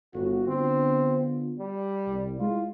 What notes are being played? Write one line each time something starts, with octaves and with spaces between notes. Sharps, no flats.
G1 F#4
D3 B3 C4 F4
G3
C2
G#3 E4 F4